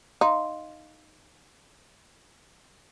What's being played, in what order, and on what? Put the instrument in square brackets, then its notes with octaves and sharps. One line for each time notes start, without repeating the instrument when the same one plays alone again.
[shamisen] D#4 [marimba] F5 C6